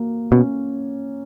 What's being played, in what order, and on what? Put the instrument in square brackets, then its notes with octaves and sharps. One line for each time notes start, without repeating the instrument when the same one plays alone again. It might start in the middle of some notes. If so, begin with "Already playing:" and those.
Already playing: [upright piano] A#3 F#4
[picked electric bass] B2 [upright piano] C#4